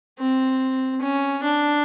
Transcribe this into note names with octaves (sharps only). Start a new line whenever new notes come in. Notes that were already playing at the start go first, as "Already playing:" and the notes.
C4
C#4
D4